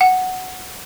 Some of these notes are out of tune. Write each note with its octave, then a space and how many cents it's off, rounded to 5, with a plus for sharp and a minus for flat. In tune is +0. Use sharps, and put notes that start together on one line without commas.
F#5 +0